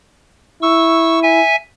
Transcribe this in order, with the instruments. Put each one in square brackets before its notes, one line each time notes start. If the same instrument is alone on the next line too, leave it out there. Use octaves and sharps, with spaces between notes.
[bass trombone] E4 [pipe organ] C#6 E6
[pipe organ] E5 G#5